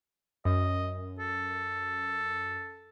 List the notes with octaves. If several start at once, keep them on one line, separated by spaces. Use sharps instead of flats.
F#2 D#5
A4